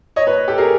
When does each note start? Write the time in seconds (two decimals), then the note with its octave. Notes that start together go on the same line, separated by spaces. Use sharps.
0.16 C#5 D#5
0.27 B4 C#5
0.48 G4 A4
0.58 G#4 A#4